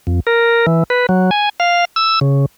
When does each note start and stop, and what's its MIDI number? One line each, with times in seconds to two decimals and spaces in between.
0.07 0.20 41
0.27 0.66 70
0.66 0.83 52
0.90 1.06 71
1.09 1.30 54
1.31 1.49 80
1.60 1.85 77
1.96 2.19 88
2.21 2.46 49